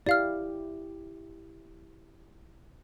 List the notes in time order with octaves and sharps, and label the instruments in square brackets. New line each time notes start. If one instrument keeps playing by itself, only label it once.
[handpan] E4 G4 [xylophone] D5 F5 F6